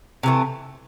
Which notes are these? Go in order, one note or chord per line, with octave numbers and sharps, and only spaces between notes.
C3 E3 A3